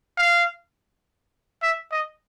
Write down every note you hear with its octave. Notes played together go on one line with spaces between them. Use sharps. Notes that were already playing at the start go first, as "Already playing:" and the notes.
F5
E5
D#5